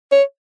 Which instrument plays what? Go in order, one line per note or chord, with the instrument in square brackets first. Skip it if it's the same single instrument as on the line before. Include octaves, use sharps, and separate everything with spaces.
[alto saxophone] C#5